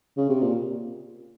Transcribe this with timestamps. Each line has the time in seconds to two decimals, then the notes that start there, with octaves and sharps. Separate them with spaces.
0.17 C#3
0.30 C3
0.42 A#2